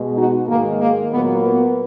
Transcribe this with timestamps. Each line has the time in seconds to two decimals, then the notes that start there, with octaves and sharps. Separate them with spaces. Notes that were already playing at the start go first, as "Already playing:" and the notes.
Already playing: B2 G#3
0.17 D#4 F#4
0.48 G#2 D#3 G#3 A#3
0.80 A#3
1.11 A#2 F#3 A#3 B3
1.44 B3